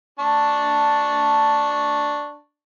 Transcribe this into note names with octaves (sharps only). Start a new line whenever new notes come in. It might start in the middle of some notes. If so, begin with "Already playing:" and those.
D4 A5 C#6